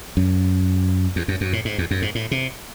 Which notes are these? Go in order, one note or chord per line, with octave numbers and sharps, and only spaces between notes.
F#2
E2
F#2
F#2
A2
G#2
E2
F#2
G#2
A2
C3